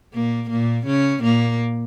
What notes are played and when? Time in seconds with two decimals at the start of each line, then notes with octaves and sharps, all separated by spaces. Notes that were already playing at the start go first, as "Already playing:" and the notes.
0.14 A#2 A#3
0.50 A#2 A#3
0.87 C#3 C#4
1.23 A#2 A#3